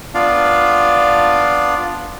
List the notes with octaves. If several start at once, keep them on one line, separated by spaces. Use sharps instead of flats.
B3 D4 F4 D5 F5